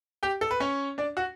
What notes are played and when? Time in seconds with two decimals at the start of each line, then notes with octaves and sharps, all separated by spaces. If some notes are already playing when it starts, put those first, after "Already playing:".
0.23 G4 G5
0.41 A4
0.51 B4
0.60 C#4 C#5
0.98 D4 D5
1.17 F#4 F#5